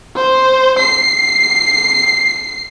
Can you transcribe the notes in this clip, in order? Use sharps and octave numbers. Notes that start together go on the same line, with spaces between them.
C5
C7